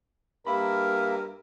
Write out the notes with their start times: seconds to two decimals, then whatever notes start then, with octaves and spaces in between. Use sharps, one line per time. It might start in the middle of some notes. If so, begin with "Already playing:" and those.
0.47 G2 A#3 A#4 E5 B5